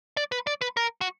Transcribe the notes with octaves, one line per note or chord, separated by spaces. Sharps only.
D5
B4
D5
B4
A#4
F#4